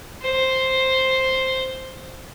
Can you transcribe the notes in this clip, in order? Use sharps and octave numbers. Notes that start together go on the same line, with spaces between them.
C5